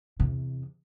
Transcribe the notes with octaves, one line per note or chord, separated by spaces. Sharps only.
E2 C3